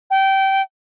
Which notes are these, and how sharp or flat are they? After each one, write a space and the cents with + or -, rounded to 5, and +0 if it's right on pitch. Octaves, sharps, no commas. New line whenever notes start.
G5 -20